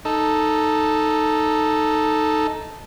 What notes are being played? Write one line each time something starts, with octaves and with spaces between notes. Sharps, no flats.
D#4 A4